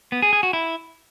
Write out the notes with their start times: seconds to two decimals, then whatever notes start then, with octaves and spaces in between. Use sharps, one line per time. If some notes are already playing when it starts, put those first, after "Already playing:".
0.12 B3
0.22 G#4
0.33 G#4
0.43 F#4
0.53 E4